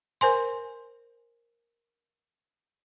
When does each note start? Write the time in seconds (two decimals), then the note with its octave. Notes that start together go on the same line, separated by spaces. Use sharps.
0.21 A#4 C5 G#5 C6